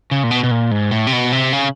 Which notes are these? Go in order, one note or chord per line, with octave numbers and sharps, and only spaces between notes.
C#3
A#2
B2
B2
A#2
G#2
A2
C3
B2
C3
C#3